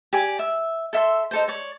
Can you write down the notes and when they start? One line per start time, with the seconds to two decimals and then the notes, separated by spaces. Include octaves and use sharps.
0.13 G4 D5 G#5
0.39 E5
0.93 A4 E5 C6
1.31 D#4 A4 C5
1.48 C#5 D5